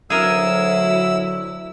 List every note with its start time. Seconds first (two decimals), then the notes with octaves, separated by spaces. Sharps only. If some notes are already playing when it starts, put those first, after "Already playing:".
0.10 D2 F#3 E4 G#4 A#4 E6